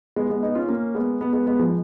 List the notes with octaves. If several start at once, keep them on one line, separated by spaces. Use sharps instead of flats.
G#3 B3
G#3 B3
B3 D#4
C#4 F4
A#3 C#4
G#3 B3
G#3 B3
G#3 B3
G#3 B3
F3 G#3